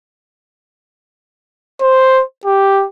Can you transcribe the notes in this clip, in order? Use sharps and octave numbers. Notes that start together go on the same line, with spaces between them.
C5
G4